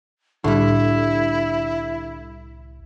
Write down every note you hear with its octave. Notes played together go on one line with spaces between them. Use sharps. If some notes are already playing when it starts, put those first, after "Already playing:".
C2 A2 D3 G3 E4